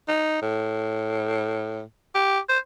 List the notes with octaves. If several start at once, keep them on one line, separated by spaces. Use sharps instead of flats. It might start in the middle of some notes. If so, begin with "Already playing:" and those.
D#4
A2
G4
C5